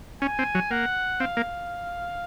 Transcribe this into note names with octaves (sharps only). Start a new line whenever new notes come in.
C#4 G#5
C4
F#3
A#3 F#5
C4 F5
A#3